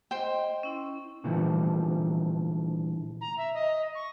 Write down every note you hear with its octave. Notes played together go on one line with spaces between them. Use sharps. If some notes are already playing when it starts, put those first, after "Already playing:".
C5 D#5 G5 C6
C#4 E4
A#2 D3 E3 F3 G3 A3
A#5
E5
D#5
C#6